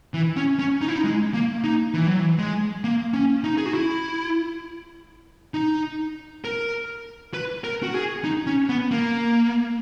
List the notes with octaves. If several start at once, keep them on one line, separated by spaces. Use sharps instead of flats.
E3
C#4
C#4
D#4
E4
D#4
G#3
A#3
D#4
E3
F#3
E3
G#3
A#3
C#4
D#4
G#4
F#4
E4
D#4
A#4
B4
A#4
F#4
G#4
D#4
C#4
B3
A#3